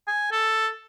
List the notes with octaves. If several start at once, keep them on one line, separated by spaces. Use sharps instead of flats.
G#5
A4